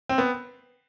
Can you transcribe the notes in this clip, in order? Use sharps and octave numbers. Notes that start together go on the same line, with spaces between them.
C4
B3